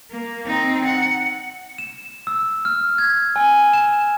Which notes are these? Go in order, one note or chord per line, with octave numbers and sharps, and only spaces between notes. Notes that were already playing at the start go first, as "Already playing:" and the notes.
A#3
C4 D#4
F#5
E7
E6
F6
G#6
G#5
E7